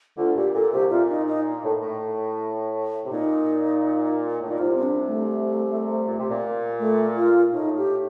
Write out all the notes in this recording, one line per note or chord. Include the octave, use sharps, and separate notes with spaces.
D2 D3 F4
A#2 G4
A#2 A4
C2 C3 G4
A#2 F4
D#4
D#4
A2
A2
C3
A#2 D#4
A2
A#2 D#4
C2 C3 F4
C4
D4
A3
A#2
C3
A#2
A3
F4
A2 D#4
G4